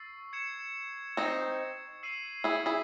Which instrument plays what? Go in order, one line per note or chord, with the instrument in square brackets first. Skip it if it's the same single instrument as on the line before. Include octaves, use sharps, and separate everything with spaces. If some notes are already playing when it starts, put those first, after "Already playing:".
Already playing: [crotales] C#6 E6 A6 C7
G#6 C#7 E7
[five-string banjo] C4 D#4
[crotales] E6 C7 D#7 F#7
[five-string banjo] E4 G#4
E4 G#4